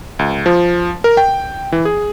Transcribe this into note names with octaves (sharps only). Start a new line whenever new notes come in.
C#2
F3
A#4
G5
E3
G#4